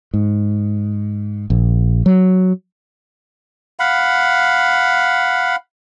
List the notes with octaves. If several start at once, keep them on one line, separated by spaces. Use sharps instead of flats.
G#2
A#1
F#3
F5 F#5 B5